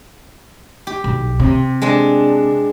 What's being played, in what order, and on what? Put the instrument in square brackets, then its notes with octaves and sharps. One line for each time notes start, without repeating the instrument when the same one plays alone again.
[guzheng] G4
[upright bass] B1
C3
[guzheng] G#3 C4 D4